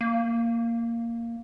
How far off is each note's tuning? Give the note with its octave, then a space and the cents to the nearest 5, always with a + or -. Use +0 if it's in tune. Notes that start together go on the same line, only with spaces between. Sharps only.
A#3 -5